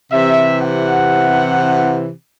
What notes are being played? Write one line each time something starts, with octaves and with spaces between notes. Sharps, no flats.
C3 E3 E5
F#5